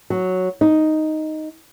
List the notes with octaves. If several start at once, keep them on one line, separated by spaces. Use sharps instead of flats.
F#3
D#4